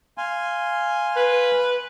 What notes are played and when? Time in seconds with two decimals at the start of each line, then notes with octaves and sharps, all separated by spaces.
0.18 F5 G#5 C6
1.16 B4